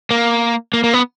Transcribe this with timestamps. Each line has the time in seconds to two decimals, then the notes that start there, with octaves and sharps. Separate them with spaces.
0.11 A#3
0.74 A#3
0.84 A#3
0.94 B3